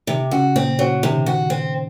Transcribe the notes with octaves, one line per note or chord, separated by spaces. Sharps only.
C3 D#3
C#3 F#4
A#2 C4
C#3 F#3
C3 D#3
F#4
C4